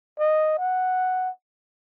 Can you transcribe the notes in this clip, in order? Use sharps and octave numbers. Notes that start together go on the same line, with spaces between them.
D#5
F#5